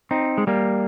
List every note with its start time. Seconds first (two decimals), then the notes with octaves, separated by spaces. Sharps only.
0.11 C4 D#4
0.38 G#3
0.47 G3 A#3